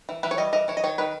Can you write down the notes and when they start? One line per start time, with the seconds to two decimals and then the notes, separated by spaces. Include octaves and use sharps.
0.09 E3
0.23 E3 B4
0.31 C#5
0.38 G3 D#5
0.53 E3 D#5
0.68 E3 C#5
0.77 D#5
0.84 D#3 C#5
0.98 D#3 B4